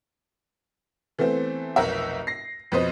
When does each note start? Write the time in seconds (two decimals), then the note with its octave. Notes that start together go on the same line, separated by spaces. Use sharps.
1.19 E3 A3 B3 C4
1.76 F1 B1 A#4 E5
2.27 A#6 C7
2.72 F2 B2 B4 C5 D#5